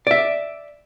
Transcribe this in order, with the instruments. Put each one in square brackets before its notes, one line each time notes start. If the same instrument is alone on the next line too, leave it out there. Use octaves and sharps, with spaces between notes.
[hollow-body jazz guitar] D5 E5